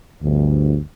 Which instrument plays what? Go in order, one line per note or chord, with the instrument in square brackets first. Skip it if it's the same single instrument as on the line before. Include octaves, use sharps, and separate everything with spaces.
[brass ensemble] G1 D2